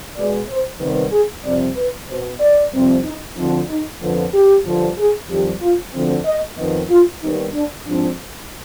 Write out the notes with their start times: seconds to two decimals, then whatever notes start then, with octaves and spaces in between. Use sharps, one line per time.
0.15 B2 G#3 B3 D5
0.49 C5
0.80 C3 D#3 G3 B3 B4
1.12 G#4
1.44 F2 C3 G3 C4 D5
1.77 B4
2.09 B2 B3 C5
2.40 D5
2.72 F2 C3 G3 C4
3.04 D#4
3.36 D2 D3 F3 C4 D#4
3.69 D#4
4.01 F2 D3 F3 B3 F4
4.33 G4
4.65 G2 D3 F3
4.98 G#4
5.29 F2 D#3 G3 G4
5.61 F4
5.94 D2 D3 F3 C4
6.25 D#5
6.57 F2 D#3 B3 D#5
6.90 F4
7.22 D#2 D#3 G3 B3 D#4
7.53 D4
7.85 G#2 F3 C4 D4